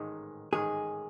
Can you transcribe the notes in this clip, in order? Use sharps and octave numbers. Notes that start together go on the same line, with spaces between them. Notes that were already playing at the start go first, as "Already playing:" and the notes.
Already playing: A1 G#2 D#3 G#3
A1 G#2 D#3 G#3 G#4